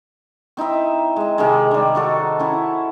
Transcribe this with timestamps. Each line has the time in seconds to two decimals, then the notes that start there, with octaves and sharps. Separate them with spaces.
0.57 C4 D#4 E4 E5
1.16 G#3 D#5
1.38 C3 D#3 G#3
1.71 D#3 G3
1.95 D#4 F#4 A4
2.40 C#4 E4